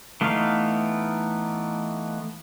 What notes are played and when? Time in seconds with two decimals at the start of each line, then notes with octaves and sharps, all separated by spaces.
0.21 E3 A3 B3 D#4 F5